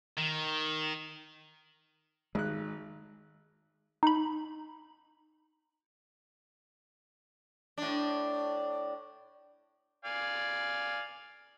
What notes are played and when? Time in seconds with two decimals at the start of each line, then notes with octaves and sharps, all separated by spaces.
0.18 D#3
2.35 G#1 G#3 F#6
4.03 D#4 B5
7.78 A2 D4
10.05 D5 F5 G#5